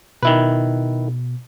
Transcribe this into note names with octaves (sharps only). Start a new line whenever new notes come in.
B2 D#3 E4 B4